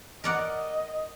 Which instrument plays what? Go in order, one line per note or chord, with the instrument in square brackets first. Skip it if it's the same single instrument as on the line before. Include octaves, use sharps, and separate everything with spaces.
[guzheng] A#4 D5 F#5 [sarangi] D#5